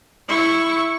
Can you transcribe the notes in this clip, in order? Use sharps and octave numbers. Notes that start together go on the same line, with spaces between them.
E4 C#6